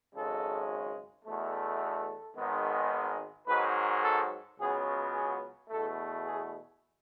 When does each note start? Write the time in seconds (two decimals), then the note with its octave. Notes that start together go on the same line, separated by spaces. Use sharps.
0.14 G#1 F#2 C#3 G#3 A4
1.25 E2 B2 A3
1.80 A4
2.36 G#1 G#2 D#3 G#3 B3
3.47 G#2 D#3 F#3 B4
4.03 A4
4.58 C#2 C#3 F#3 B3 G#4
5.14 G#4
5.69 E2 B2 A3 A4
6.25 G#4